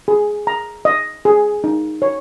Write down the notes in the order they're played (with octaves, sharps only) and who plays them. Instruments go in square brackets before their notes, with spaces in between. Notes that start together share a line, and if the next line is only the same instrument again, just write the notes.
[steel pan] G#4
A#5
D#5
G#4
D#4
C#5